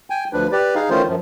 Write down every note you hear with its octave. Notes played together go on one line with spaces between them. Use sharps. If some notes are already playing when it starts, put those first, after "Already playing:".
G5 G#5
D2 F3 D4 B4
G4 B4 D5
D#4 G#4 F5
D#3 E3 A3 C#4 F4 C5
F#2 F3